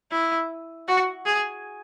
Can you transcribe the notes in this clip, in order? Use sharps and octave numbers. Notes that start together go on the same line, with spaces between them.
E4
F#4
G#4